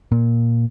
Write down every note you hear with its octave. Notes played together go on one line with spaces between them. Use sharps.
A#2